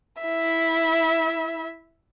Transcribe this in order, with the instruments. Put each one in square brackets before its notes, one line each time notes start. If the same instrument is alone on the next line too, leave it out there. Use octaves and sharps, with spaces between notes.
[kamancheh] E4 E5